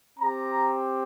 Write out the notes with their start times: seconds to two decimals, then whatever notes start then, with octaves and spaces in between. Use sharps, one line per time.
0.19 C4 G4 A#5